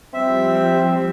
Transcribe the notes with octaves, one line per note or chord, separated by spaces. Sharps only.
F3 G3 C4 E5